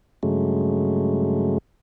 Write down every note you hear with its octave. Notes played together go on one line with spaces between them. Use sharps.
G2 C#3 F#3 G#3 A3